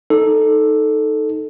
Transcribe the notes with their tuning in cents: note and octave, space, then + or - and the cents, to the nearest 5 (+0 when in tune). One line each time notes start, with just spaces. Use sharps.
D#4 +0 A4 +0